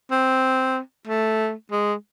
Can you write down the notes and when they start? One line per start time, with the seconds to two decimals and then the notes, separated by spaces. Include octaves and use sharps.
0.11 C4
1.07 A3
1.71 G#3